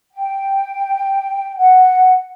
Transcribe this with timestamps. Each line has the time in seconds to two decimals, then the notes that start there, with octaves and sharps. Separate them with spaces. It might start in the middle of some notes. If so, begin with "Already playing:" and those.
0.13 G5
1.57 F#5